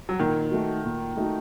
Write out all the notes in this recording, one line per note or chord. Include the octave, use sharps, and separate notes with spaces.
F#3
A#2 D#3
A3 D#4 F#4
A#2
A3 D#4 F#4